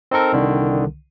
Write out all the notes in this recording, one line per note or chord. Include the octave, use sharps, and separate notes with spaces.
C4 D#4 A4 A#4
C2 D3 D#3